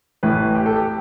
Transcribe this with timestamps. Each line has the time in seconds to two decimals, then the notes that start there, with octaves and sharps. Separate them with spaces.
0.23 A1 A2 E3 B4
0.55 G4
0.66 A4
0.76 G4